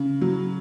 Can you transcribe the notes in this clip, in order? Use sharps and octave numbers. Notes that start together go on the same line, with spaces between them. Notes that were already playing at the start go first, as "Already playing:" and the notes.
Already playing: C#3
F#3